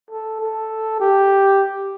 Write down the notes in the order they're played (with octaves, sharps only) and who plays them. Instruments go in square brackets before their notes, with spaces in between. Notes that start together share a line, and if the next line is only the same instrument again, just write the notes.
[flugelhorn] A4
A4
G4